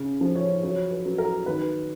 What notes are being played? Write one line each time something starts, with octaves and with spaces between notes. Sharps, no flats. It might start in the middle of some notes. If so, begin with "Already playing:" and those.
Already playing: C#3
F3
C#5
F#3 C#5
B4
F#3
A#4
D#3 B4